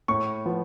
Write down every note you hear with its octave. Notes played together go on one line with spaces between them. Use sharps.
A2 C#6
F3 B3